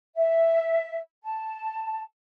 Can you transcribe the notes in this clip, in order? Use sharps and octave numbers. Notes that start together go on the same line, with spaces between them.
E5
A5